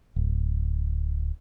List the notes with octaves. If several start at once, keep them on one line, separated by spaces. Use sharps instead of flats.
D1